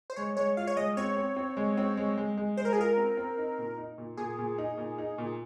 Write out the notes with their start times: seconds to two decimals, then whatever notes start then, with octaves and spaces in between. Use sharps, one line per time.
0.10 C5
0.16 G#3 C#5
0.37 G#3 C#5
0.57 F4 F5
0.67 C#5
0.77 G#3 D#5
0.97 C4 C#5
1.16 C4
1.36 C4
1.57 G#3
1.77 C4
1.97 G#3
2.18 G#3
2.37 G#3
2.57 G#3 C5
2.65 A#4
2.73 G#4
2.78 F4 A#4
2.97 C4
3.17 C4
3.38 D#4
3.58 A#2
3.78 D#4
3.98 A#2
4.17 A#2 G#4
4.38 A#2
4.58 D#4
4.78 A#2
4.98 D#4
5.18 A#2